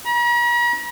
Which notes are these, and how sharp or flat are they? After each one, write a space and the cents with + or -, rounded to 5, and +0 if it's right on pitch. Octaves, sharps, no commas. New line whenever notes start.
A#5 +45